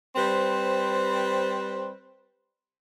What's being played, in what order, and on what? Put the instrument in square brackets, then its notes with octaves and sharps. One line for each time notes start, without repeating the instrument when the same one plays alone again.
[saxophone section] G3 C4 B4 C5